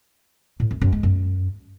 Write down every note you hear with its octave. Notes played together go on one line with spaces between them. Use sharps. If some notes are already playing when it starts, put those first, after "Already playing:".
A2
F#2
F#2
G#3
F#2